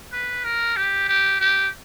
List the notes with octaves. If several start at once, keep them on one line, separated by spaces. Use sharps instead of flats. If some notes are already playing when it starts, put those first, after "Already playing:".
B4
A#4
G4
G4
G4